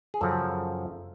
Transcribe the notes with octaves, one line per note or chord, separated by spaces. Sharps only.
G#4
F#2 C#3 F3 A4